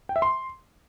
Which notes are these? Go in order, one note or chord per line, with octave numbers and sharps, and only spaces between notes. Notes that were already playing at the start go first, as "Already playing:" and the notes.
G5
E5
C6